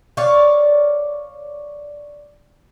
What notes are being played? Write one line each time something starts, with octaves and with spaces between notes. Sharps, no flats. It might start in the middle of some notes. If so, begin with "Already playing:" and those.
C#5 D5 F5